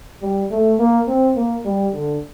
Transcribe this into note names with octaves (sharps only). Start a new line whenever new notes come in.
G3
A3
A#3
C4
A#3
G3
D3